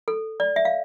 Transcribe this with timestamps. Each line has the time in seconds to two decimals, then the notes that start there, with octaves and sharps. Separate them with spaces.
0.08 A4
0.40 D5
0.56 E5
0.65 F5